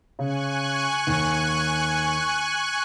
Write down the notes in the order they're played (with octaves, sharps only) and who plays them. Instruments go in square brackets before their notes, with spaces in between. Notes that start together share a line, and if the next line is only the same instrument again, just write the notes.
[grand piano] C#3 [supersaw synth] G#5 C#6 F#6
[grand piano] D#2